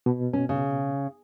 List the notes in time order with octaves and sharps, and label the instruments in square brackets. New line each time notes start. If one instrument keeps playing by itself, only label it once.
[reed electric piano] B2
[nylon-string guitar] C#4
C#3